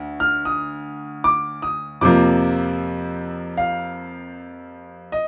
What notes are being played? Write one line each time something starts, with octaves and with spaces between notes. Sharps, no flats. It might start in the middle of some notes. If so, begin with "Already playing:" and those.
Already playing: D2
F6
D#6
D6
D#6
F2 C3 F3 A#3 D6
F5
D#5